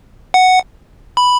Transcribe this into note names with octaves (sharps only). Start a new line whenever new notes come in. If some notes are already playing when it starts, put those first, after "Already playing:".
F#5
B5